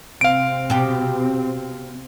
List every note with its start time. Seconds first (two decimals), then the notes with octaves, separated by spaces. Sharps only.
0.21 C3 C4 F5 D7
0.70 B2 G4